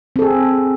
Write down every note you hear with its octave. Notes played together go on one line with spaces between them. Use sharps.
C4 G#4 A4